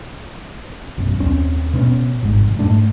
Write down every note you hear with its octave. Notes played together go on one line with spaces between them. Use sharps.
B1 F#2
D#2 C4 C#4
B2 C4 C#4
G#1 G#2
F1
G#2 A3 D4